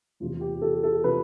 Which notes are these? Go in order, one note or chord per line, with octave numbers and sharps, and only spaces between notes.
E2 C3 F3 F4
G4
A4
A4
C3 F3 B4